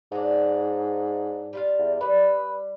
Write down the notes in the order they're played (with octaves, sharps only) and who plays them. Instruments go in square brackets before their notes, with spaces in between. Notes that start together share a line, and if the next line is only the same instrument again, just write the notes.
[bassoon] G#2 [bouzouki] F#3 D4
[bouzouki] G3 F4 F5
[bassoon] E2
[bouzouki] G3 [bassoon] B4